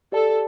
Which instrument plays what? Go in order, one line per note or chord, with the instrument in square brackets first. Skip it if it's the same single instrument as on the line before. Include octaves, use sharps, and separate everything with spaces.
[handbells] G4 D5 A5 [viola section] A4